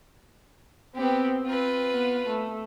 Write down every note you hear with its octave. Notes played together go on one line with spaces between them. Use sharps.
B3 C4 G4
C4 F4 B4
B3
A3